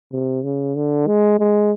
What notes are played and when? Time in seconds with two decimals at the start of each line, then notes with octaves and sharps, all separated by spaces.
0.12 C3
0.44 C#3
0.75 D3
1.07 G#3
1.39 G#3